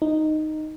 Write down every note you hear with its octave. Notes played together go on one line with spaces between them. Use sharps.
D#4